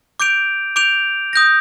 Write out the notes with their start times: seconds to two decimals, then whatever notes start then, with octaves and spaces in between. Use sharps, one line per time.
0.20 D6 G6 D7 F7
0.76 D6 G6 D7 F7
1.33 D#6 G6 A#6